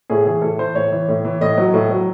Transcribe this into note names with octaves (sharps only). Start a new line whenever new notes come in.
A2 G#4
E3 G#4
A2 A4
E3 C5
A2 C#5
E3
A2
E3
A2 D#5
F#3
A2
F#3